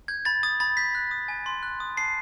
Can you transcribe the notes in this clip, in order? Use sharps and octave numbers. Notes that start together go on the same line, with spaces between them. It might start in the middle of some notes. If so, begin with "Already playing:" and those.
G6 G#6
B5 A6
D#6 A6
B5 A6
G6 B6
F#6
D#6
G#5
C6
F#6
D#6
A5 C7